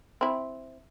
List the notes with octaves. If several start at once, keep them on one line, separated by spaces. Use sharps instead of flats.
C4 E4